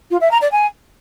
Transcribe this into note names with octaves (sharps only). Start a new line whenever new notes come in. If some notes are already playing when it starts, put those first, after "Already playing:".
F4
E5
A#5
D5
G#5